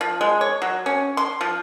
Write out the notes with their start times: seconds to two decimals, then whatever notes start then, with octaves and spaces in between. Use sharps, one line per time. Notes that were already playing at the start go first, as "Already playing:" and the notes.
0.01 F3
0.21 G#3
0.41 C#5
0.62 F#3
0.86 C#4
1.17 C6
1.41 F3